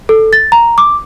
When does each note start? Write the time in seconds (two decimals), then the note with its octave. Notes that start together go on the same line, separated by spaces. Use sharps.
0.09 A4
0.33 A6
0.52 A#5
0.78 D6